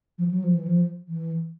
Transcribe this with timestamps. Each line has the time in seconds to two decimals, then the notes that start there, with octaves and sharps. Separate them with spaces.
0.18 F3
0.31 F#3
0.44 F3
0.55 E3
0.68 F3
1.08 E3